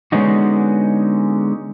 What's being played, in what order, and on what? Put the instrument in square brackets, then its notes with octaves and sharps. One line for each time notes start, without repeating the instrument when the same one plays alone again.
[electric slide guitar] D3 G#3 B3 C#4 D#4 F#4